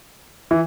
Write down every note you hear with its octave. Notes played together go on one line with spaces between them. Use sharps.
E3